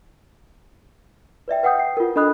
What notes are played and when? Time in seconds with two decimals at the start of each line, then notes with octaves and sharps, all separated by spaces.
1.48 B4 D5 E5 G5
1.63 B4 F#5 G5 D#6 G6
1.78 G5 C7
1.97 F4 A#4
2.16 D4 A4 D#5 B5 D#6 F#6